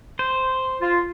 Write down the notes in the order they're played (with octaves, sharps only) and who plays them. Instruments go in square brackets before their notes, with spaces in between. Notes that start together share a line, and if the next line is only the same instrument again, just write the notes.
[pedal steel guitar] C5
[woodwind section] F4